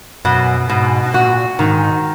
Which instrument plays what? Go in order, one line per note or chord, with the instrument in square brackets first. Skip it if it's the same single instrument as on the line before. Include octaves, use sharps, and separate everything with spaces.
[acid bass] F#2 [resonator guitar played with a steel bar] B2
[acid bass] G#2 [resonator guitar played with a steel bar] B2
[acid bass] A#2 [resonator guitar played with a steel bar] F#4
[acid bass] G#2 [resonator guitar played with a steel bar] D#3